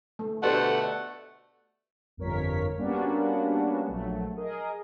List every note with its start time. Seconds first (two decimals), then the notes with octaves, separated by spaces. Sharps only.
0.19 A3
0.43 B2 D3 A3 G4 C5 F#5 A5
2.17 G1 F2 A#4 C#5 B6
2.78 G3 A#3 B3 C#4 D4 F#4
3.85 A#1 F#3 A3
4.36 G#4 A#4 D#5